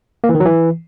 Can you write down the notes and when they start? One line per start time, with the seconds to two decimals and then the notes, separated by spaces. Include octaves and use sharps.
0.24 A#3
0.29 E3
0.35 D#3
0.40 F#3
0.46 E3